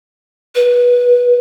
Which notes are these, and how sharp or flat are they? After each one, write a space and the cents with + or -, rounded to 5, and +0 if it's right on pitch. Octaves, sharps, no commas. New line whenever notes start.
B4 -15